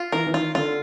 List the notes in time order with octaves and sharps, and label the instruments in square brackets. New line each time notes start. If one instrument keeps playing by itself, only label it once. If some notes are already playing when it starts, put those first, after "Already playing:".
Already playing: [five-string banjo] F4
[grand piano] E3 [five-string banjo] A#4
[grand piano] E3
[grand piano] D#3 [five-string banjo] F4
[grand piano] D3 [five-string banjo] F4